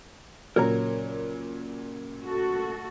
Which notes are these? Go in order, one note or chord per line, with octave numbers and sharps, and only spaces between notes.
A#2 C#3 F#3 A#4 C#5 A#5
A3 F#4 A4